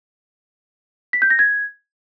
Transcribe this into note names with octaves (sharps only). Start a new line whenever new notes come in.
B6
G6
A#6
G#6